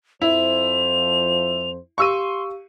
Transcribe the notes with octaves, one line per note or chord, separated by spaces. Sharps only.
F2 F3 E4 C5 F7
G4 F5 C6 C#6 E6 D#7